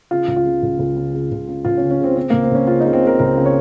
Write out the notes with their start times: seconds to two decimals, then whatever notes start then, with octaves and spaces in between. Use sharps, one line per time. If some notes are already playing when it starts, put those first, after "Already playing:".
0.11 C#3 F4
0.28 C#2
0.36 F4
0.45 C#3
0.63 C#2
0.79 C#2
0.96 C#3
1.14 C#3
1.32 C#2
1.48 C#3
1.65 C#2 F4
1.77 C#4
1.83 C#3
1.91 C#4
2.00 C#3 C4
2.16 C#3 C4
2.30 C#2 A#3
2.43 C4
2.51 C#2 C#4
2.67 C#3 F4
2.80 D#4
2.86 C#3
2.93 C4
3.02 C#3 A#4
3.19 C#2 A#4
3.37 C#3
3.46 C#5